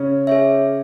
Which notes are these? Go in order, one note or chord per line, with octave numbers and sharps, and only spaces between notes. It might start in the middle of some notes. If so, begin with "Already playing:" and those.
Already playing: C#3 C#4
G#4 C#5 E5